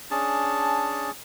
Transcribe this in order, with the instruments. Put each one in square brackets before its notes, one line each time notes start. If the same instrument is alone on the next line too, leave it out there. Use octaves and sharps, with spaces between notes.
[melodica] C#4 D4 G#4 A5